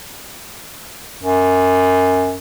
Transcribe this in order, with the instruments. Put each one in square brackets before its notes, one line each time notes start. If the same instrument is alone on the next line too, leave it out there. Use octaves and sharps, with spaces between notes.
[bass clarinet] F#2